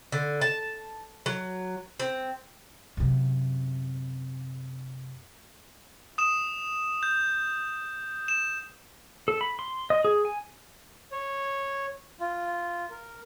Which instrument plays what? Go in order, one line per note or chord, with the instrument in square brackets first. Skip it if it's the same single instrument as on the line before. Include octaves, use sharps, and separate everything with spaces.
[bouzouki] D3
A5
F#3
C4
[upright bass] F#2 C3
[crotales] D#6 E7
G6
E7
[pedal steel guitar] A4
B5
C6
D#5
G#4
G#5
[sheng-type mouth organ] C#5
F4
A#4